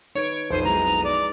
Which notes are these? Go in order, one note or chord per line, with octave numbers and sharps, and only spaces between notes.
D#4 B4 C#5 G#6 D7
B1 F2 D#4 B4 C5 D#7
G#3 E4 G#4 A#5
D5